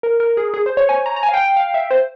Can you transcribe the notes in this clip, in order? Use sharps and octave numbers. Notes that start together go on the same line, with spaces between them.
A#4
A#4
G#4
G#4
C5
C#5
G#5
A#5
A#5
G#5
F5
G5
G5
F5
E5
C5